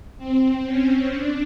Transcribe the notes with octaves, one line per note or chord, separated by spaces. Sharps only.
C4
C#4
D4